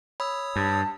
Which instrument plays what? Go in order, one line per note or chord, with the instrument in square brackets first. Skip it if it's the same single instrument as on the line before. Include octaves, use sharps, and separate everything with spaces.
[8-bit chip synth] C#5 D#6 E6 [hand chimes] B5
[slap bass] G2 [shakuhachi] A5